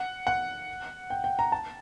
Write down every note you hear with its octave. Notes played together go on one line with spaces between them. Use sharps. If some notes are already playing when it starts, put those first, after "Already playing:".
Already playing: F#5
F#5
G5
G5
A#5
A5